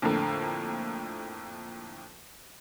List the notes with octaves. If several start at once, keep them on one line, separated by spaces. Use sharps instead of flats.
F2 A2 D3 A#3